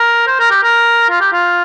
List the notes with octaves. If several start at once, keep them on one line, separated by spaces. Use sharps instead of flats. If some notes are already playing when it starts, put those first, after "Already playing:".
Already playing: A#4
C5
A#4
G4
A#4
F4
G4
F4